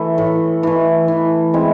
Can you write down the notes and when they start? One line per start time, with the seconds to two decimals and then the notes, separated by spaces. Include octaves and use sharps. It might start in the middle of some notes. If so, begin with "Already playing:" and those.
Already playing: E3 A3
0.18 A2
0.63 E3 A3
1.08 E3
1.54 G#3 C4 E4